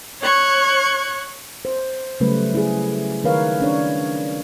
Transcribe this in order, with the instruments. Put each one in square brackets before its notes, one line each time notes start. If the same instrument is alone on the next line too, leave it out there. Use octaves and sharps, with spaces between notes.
[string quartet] C#5 C#6 F#6 G#6
[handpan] C5
C#3 F#3 G3 A3 B4
E4 G#4
D#3 A#4 B4 C#5 F5
C#4 D4 C#5